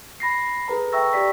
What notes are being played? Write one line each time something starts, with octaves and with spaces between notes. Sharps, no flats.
B5 A#6 C7
G#4 A4 B4 A#5
E5 G5 A#5 C#6 E6 A#6
G4 D5 B6